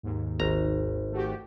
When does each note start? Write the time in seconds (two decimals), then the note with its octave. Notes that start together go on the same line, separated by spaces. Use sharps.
0.03 D#2 G#2
0.40 G#1 A#5
1.12 A3 F#4 G4